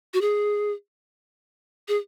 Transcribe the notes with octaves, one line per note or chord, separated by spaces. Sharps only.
F#4
G#4
G#4